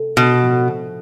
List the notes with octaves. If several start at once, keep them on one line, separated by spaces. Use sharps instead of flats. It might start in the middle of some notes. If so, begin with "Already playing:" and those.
Already playing: C3 A3 A4
B2
A2 F3 G#3 D4